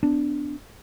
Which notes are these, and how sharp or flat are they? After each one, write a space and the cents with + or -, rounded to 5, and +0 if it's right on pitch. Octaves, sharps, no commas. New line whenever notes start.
B3 +40 D4 +0